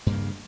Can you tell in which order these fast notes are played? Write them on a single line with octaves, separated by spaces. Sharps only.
G2 A#3 C#3